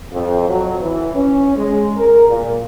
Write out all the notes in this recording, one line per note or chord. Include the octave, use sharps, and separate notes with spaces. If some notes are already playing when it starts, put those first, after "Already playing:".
F2
F#3
E3
C#4
G#3
A#4
A#2